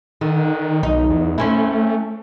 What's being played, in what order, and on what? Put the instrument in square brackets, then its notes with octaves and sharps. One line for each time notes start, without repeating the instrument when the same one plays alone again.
[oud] D3 [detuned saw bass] D#3
[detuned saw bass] B1 [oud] D#4
[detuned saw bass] E2
[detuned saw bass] A3 [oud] C4 C#4 E4